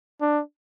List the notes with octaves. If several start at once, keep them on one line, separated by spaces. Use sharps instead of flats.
D4